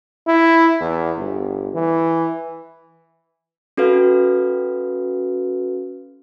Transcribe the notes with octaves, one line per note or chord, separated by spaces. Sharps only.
E4
E2
G1
E3
C#4 F#4 A4 B4 F5